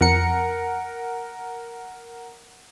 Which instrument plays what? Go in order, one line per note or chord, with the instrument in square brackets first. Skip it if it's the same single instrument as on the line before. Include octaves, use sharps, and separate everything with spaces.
[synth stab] F2 C#7 [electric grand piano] A#4 F#5 A#5